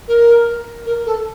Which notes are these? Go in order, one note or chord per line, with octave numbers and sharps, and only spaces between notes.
A#4
A#4
A4